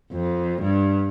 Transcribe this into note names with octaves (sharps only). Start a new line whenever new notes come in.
F2
G2